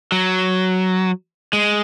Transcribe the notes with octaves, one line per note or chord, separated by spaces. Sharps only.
F#3
G#3